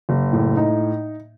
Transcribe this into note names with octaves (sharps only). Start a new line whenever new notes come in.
F#1
A2
D#4